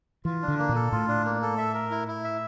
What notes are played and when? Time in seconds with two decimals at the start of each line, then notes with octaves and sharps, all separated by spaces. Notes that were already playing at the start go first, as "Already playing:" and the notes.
0.25 E3 F4
0.42 D4
0.48 D3
0.58 A#3
0.69 A#2
0.75 A4
0.92 A2 F4
1.08 D4
1.24 A#3
1.42 A4
1.58 E5
1.74 A#4
1.91 E4
2.08 E4
2.24 E5